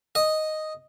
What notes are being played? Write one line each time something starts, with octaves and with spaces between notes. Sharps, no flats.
D#5